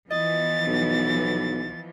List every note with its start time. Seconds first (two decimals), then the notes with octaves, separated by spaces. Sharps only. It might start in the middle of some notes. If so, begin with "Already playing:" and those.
0.10 E3 F3 B3 D#5 A6
0.67 B1